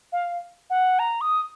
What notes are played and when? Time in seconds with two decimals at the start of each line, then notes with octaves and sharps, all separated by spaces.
0.12 F5
0.70 F#5
0.99 A#5
1.21 D#6